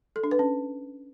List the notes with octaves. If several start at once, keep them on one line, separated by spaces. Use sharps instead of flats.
A4
D4
B4
C#4